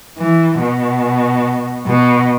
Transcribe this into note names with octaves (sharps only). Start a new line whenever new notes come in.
E3
B2
B2